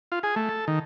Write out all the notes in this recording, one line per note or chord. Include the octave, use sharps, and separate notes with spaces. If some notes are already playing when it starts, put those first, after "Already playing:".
F4
G#4
A3
A4
D#3